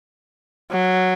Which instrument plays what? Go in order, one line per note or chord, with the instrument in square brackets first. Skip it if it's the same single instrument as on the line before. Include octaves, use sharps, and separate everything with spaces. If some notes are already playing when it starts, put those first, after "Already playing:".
[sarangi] F#3